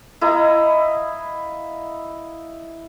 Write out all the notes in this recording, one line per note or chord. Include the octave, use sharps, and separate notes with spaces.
E4 D#5 F5 A#5